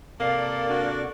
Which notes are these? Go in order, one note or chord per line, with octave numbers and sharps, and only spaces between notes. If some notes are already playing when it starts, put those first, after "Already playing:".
C3 A#3 A4 A#4 D5 F5
D4 F#4